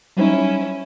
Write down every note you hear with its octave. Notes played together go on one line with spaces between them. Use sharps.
F#3 G3 C#4 D#4 E4